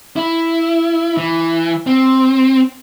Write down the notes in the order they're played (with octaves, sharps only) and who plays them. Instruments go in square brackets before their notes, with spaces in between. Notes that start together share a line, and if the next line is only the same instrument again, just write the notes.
[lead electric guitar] E4
E3
C4